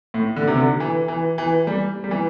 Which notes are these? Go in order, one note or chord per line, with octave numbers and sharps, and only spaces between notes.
A2
D3
C3
D3
E3
E3
E3
G3
G3
E3